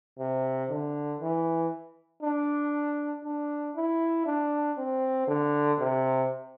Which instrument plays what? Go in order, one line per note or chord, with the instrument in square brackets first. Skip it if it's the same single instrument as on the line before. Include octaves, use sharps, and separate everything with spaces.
[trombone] C3
D3
E3
D4
D4
E4
D4
C4
D3
C3